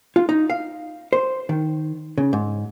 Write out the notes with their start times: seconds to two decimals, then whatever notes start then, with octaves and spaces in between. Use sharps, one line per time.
0.16 F4
0.29 D#4
0.50 F5
1.13 C5
1.49 D#3
2.18 C#3
2.33 G#2